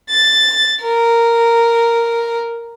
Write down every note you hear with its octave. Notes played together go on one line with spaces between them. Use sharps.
A6
A#4